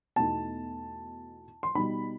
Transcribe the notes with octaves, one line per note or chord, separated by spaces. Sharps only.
E2 B2 A3 D#4 A5
C6
B2 G3 D#4 B5